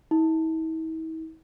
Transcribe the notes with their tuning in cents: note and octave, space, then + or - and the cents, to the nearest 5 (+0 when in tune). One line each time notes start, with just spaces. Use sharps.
E4 -45